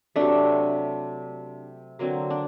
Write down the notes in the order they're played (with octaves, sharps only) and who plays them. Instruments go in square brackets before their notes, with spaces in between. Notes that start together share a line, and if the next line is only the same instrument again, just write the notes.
[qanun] C3 F#3 A3 D4
D3 F#3 A#3 C4
D4